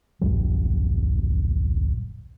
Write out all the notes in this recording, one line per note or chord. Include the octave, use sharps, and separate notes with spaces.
D1 A#1 F#2 G3